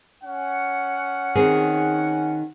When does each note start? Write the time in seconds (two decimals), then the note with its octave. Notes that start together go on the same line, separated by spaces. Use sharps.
0.23 C#4 F#5
1.35 D#3 C4 G#4